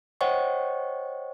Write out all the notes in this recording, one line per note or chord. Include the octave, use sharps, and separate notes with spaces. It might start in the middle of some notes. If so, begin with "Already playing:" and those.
C5 C#5 D#5 F#5 G5 C#6